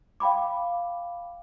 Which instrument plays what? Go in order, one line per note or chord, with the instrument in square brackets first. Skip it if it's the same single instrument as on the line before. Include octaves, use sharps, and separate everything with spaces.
[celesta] F5 G5 B5 D6